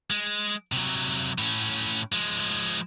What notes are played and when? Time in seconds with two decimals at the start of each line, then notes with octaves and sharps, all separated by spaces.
0.11 G#3
0.72 C3 F#3
1.38 A2 C#4
2.12 F3 G#3